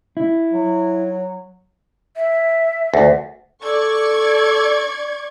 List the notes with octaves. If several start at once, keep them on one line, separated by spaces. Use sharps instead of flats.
E4
F#3
E5
D2
A4 D5 C#6 G#6